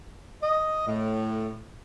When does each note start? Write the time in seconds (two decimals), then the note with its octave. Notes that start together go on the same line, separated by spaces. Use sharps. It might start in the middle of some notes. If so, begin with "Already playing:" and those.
0.42 D#5
0.87 A2